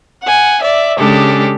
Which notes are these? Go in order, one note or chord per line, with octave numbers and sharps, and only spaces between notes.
F#5 G#5
D5 E5
C#3 G#3 D4 G4 A4